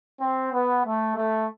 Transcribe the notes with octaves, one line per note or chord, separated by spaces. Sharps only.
C4
B3
A3
A3